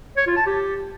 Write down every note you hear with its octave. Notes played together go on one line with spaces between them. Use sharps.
C#5
F4
A5
G4